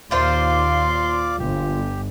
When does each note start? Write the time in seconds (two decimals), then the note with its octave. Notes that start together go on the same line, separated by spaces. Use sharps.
0.11 D#2 A#2 F4 C5 D5 F5 C6 D6
1.39 G1 G4